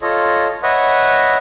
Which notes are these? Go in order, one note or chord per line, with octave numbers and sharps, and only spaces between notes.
F4 A4 C#5 D#5
B4 C#5 D#5 E5 F#5